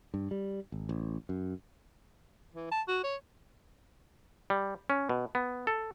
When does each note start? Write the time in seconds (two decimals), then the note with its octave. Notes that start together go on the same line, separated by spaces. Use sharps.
0.14 G2
0.31 G3
0.72 G#1
0.89 A1
1.29 F#2
2.54 E3
2.72 A5
2.88 F#4
3.04 C#5
4.50 G3
4.90 C#4
5.09 B2
5.35 B3
5.67 A4